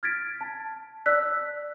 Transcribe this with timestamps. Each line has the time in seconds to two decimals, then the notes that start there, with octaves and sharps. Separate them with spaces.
0.03 F6 G#6 A6 B6 D7
0.41 A5
1.06 D5 E6 F#6 B6